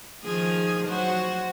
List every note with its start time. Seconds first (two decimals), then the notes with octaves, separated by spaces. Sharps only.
0.24 D#3 F3 G#4
0.87 F#3 F#4 C5